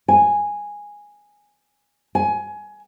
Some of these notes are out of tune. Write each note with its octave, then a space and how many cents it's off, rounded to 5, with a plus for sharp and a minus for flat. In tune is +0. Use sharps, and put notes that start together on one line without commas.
G#5 -5
G#5 +20